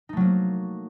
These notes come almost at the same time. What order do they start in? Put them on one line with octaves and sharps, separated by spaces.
D#4 A3 F#3 A#3